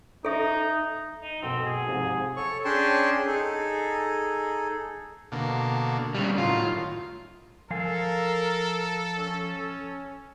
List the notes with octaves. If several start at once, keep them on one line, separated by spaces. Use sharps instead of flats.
D#4 A4 E5
D#4
F#1 B2 C4 A4
G#4
G#2 C3 F3
A4 C#5 C#6
C#4 D4 G#4 G5 A5 C6
D#4 G#4 A4
B2 D3 A#3
C#3 G3
A2 D#3 F#3 F4
F3 A4 A#4 F5 G#5
C#4